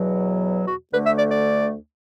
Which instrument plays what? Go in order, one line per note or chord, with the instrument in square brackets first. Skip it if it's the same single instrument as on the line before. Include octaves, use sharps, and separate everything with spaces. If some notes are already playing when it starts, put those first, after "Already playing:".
Already playing: [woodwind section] E2 B2 F#3
F#4
D2 D3 A3 B4
E5
D5
D5